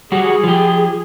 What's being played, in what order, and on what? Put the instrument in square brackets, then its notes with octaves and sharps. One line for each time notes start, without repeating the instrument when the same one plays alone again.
[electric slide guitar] G3 F#4 [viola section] G#4
[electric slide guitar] F3 G4